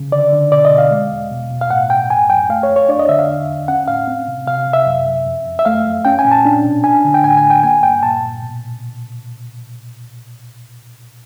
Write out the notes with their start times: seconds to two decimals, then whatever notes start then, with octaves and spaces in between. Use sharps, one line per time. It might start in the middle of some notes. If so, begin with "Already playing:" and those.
Already playing: C#3
0.12 D3 D5
0.33 D3
0.52 B2 D5
0.65 D#5
0.72 B2
0.78 F5
0.91 G#3
1.11 E2
1.31 B2
1.50 B2
1.61 F5
1.70 A2 F#5
1.90 A2 G5
2.10 F#2 G#5
2.30 F#2 G5
2.49 A3 F5
2.63 C#5
2.69 F2
2.76 C#5
2.89 D4 D5
2.99 D#5
3.09 D3 E5
3.19 F5
3.28 E2
3.48 E2
3.68 C#4 F#5
3.88 A2 F5
4.07 C4
4.28 C3
4.47 C3 F5
4.67 C3
4.73 E5
4.87 F#2
5.06 F#2
5.26 F2
5.46 F2
5.59 E5
5.65 A3 F5
5.85 F#2
6.05 C#4 G5
6.19 G#5
6.25 A#2
6.32 A5
6.45 D4
6.64 B2
6.84 D4 G#5
7.04 D3
7.14 G5
7.24 A2 G#5
7.37 G#5
7.44 A2
7.50 G5
7.63 A#3 G#5
7.83 G2 G5
8.03 A#2 A5
8.23 A#2
8.42 B2